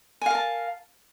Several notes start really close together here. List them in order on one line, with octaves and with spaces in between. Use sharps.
G#5 F5 A#4 A5